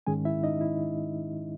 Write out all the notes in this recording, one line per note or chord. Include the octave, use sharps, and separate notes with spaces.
G#2 D#3 G#3 C#4 G#4 G#5
E4 E5
D#4 D#5
E4